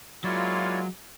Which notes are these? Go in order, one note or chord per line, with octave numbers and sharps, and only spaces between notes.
F#3 G#3 A#3 E4 F4 C#5 D5